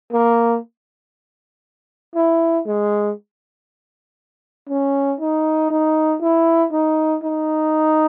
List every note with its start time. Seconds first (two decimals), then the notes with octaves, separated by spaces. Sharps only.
0.12 A#3
2.15 E4
2.66 G#3
4.69 C#4
5.20 D#4
5.70 D#4
6.21 E4
6.72 D#4
7.23 D#4